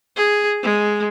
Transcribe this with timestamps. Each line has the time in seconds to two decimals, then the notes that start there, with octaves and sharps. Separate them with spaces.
0.16 G#4
0.63 G#3